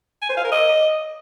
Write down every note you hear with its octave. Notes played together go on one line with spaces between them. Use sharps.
G#5
C5
F5
A#4
D#5